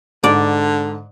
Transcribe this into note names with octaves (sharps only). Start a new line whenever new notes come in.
G#2 D3 D5